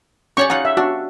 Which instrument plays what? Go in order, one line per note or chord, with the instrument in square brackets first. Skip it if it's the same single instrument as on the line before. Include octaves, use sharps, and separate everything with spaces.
[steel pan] C#4 C#6 [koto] G4 C#5 D5
[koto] D#4 F4 [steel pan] F#5
[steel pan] E5
[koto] D4 [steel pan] F#4